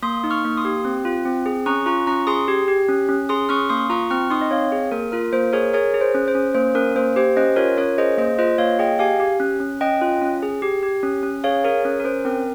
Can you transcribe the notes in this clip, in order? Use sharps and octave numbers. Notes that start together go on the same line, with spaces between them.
A#3 C6 D#6
D#4
C#6 F6
A#3
C6 D#6
G4
C4
F4
C4
G#4
C#4 A#5 C#6
F4 A#5 C#6
C#4 A#5 C#6
G#4 C6 D#6
G4
G4
C#4
C#4
G#4 C6 D#6
C#4 C#6 F6
A#3 C6 D#6
F4 A#5 C#6
C4 C#6 F6
D#4 C6 D#6
D#5
C4 C#5 F5
G#4
A#3 A#4
F4 A#4
A#3 C5
G#4 A#4 C#5
G#4 A#4 C#5
G#4
C5
C#4
C5
C#4
A#3 C5
C#4 A#4
A#3 C5
G4 C5
C#4 C5 D#5
F4 A#4 C#5
C#4 A#4 C#5
G#4 C5 D#5
A#3 C5 D#5
F4 C5 D#5
A#3 C#5 F5
G#4 D#5 G5
G4 F5 G#5
G4
C#4
C#4
C#4 D#5 G5
F4
C#4
G#4
G4
G4
C#4
C#4
G#4 C#5 F5
G#4 A#4 C#5
C#4
A#4
C#4 C5
C4 A#4